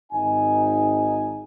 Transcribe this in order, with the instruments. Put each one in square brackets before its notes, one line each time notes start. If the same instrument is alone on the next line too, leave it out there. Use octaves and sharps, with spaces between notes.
[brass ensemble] G#1 D#4 G#5